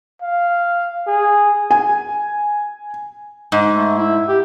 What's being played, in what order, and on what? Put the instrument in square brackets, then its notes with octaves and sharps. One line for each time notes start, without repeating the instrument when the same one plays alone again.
[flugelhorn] F5
G#4
[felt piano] G#5
[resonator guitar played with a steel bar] G#2
[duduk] A3
E4
G4